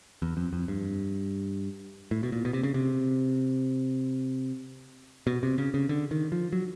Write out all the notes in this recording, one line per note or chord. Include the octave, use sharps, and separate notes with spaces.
E2
F2
F2
G2
A2
B2
A#2
B2
C3
C#3
C3
B2
C3
C#3
C#3
D3
D#3
F3
F#3